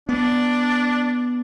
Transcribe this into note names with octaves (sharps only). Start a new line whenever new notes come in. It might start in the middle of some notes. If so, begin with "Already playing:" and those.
B3 D4